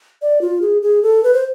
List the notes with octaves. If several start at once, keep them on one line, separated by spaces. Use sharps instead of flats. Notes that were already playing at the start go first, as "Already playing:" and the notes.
D5
F4
G#4
G#4
A4
B4
C5